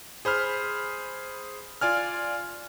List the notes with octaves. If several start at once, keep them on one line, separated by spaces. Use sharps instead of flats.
G#4 C5 B5 F6
F4 D5 G#5 F6